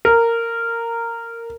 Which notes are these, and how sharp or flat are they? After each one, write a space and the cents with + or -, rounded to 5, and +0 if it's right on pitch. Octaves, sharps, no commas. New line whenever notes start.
A#4 -15